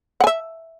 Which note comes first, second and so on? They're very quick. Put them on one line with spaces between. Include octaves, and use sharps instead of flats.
F#5 G#5 E5